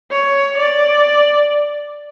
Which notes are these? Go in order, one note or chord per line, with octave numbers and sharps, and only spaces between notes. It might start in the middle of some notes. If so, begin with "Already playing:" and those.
C#5
D5